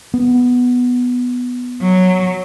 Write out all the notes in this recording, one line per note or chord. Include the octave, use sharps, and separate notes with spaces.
B3
F#3